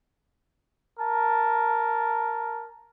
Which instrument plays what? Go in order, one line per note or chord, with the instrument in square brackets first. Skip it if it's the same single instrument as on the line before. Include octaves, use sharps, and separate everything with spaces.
[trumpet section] A#4 A5